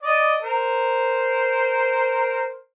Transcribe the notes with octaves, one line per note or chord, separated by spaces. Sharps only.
D5 D#5
A#4 C5